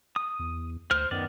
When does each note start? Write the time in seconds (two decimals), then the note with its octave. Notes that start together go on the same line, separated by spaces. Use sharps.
0.16 D#6
0.39 E2
0.91 D2 C5 F6
1.11 F#2 D#3 B3 D5